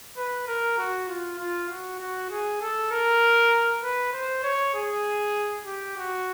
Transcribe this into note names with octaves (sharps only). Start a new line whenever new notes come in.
B4
A#4
F#4
F4
F4
F#4
F#4
G#4
A4
A#4
B4
C5
C#5
G#4
G4
F#4